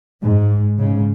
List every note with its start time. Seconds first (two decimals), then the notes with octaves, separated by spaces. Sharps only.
0.21 G#2
0.78 G#2 C#3